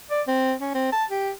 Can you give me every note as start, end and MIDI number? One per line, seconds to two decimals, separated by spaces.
0.11 0.22 74
0.28 0.53 60
0.60 0.74 61
0.75 0.89 60
0.92 1.04 81
1.10 1.31 67